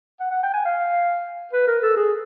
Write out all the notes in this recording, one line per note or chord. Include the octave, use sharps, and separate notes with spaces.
F#5
F#5
G5
G#5
F5
B4
A#4
A4
G#4